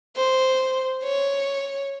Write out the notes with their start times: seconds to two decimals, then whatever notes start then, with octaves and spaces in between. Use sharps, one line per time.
0.16 C5
1.04 C#5